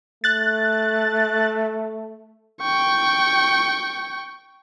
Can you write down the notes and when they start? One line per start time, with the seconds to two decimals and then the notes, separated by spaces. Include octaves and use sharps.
0.24 A3 F#6 A6
2.61 G5 C#6